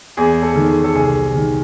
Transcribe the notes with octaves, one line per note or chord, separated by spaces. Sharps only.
E2 G#4
A4
D#3
G#4
A4
C2 G#4
D#3